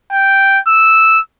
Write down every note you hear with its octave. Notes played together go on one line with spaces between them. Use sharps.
G5
E6